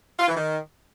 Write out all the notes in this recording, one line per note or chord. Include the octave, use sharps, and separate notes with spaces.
F4
E3
D#3